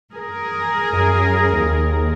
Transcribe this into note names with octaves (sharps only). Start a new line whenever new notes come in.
G#4 A#4
F#2
D#2